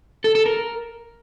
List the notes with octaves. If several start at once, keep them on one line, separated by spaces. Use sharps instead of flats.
A4
A4
A#4